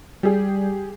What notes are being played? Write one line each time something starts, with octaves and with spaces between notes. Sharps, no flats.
G3 G4 G#4